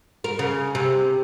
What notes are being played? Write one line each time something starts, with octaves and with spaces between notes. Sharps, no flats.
A#4
C#3
C3